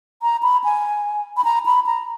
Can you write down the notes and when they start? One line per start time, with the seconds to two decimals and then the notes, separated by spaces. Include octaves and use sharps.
0.22 A#5
0.43 B5
0.64 G#5
1.37 B5
1.45 A#5
1.66 B5
1.86 A#5